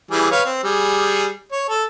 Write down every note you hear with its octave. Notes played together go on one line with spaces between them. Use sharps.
E3 G3 G#4
B4 C#5 F5
C4
G3 G#4
C#5
A4